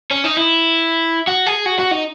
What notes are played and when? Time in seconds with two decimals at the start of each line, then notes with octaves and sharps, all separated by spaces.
0.11 C#4
0.24 D#4
0.37 E4
1.27 F#4
1.46 G#4
1.66 F#4
1.79 F#4
1.91 D#4